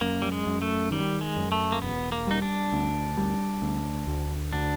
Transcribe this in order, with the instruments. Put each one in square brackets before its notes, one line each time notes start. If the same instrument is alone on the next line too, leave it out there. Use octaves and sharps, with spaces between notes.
[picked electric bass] F#2 [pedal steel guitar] A#3
[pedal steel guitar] G3
G#3
[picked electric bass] F#2
[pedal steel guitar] A3
[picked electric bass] D#3 [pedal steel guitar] G3
[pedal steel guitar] G#3
[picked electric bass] F#2
[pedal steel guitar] A3
A#3
[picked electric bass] E1 [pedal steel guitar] B3
[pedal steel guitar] A#3
[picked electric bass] G3 [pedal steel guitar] D#4
[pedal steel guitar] D4
[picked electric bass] D2
G3
D2
D2
[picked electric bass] D3 [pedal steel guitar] D4